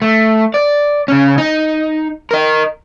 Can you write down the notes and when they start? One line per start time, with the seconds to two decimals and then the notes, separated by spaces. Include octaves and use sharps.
0.02 A3
0.54 D5
1.08 C#3 C#4
1.38 D#4
2.31 A#4 D#5